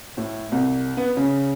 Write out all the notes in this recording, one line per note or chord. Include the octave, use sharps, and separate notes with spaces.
A2
C2
B3
C#3